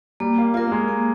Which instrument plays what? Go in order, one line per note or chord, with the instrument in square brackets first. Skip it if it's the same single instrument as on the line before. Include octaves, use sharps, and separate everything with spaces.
[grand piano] G3 [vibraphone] A#3
[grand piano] A#3
[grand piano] A#3 [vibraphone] F4 A#4
[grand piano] A#3
G#3
[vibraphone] A#3